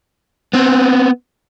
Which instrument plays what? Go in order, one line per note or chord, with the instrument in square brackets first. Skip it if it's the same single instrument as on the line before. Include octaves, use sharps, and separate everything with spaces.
[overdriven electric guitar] B3 C4